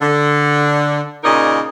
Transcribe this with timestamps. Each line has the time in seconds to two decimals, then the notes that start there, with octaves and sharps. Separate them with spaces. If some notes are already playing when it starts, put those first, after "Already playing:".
0.01 D3
1.23 A#2 C#3 D#4 A#4 D5 D#5